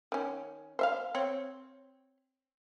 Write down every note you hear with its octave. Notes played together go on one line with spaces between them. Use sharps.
D#3 C#4
C5 E5 F5
C4 C#5